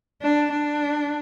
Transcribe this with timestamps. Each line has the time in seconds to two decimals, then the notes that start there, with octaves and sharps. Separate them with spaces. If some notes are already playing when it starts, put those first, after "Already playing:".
0.21 D4
0.52 D4